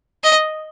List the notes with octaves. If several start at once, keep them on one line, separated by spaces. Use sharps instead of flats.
D#5